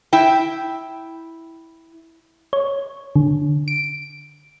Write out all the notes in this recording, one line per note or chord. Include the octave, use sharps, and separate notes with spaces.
E4 G5
C#5
D3
D7